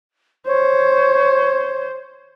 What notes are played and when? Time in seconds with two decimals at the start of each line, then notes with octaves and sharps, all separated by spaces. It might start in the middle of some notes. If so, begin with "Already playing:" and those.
0.47 C5 C#5